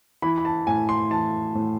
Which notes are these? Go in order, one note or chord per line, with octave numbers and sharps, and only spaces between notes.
E3 B5
B5
A5
A2 G#5
C6
E3 A5
A2